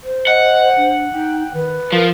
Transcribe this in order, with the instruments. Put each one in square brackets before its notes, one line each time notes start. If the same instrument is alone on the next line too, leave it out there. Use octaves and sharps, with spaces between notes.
[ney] C5
[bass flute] D#5 [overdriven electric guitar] F#5
[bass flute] D4
[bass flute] D#4 [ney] G5
[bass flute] D#3 [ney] B4
[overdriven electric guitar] F3 [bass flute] A#4